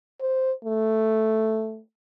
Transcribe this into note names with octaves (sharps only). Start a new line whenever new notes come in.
C5
A3